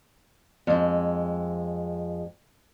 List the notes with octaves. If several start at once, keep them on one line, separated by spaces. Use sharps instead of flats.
F2 G#3